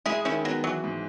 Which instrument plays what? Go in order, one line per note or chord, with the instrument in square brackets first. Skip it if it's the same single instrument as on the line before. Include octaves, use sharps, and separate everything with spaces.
[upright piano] G#3 [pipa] E4 G#4
[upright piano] D#3 [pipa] C#4 E4
[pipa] F#3 [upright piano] B3
[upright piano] E3 [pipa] F#3
[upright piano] G#2